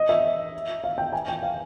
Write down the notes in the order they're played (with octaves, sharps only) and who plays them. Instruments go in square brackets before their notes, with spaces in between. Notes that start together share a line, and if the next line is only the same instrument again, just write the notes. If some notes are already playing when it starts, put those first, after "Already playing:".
Already playing: [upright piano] D#5
E5
F5
G5
G#5
G5
F5